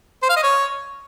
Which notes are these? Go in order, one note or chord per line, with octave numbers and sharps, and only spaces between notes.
C5
F5
D#5
C#5